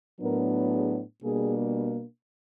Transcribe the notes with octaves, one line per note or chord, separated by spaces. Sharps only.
A2 F#3 B3 D4 A#4
G#4
B2 G3 A#3 D4 G#4